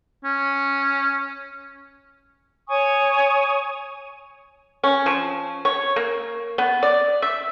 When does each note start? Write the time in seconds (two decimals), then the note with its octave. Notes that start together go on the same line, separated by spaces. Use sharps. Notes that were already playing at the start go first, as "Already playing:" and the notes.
0.24 C#4
2.69 C#5 G#5 C#6 D#6
4.84 C#4
5.06 F3
5.65 C#5
5.96 A#3
6.58 B3
6.83 D5
7.22 E5